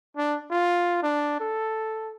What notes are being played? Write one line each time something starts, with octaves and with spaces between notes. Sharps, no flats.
D4
F4
D4
A4